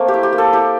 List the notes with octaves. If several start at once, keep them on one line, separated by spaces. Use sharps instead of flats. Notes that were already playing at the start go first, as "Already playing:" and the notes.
Already playing: A3 A#3 C4
G4
E4
G4
A#3
A4
E4 G4